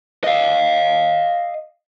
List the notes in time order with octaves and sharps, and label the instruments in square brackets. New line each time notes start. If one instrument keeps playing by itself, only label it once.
[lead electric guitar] D#5 F5